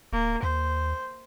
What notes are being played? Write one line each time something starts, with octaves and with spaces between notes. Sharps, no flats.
D1 A#3
D#2 C5